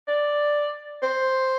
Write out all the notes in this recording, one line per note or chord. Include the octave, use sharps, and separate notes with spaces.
D5
C5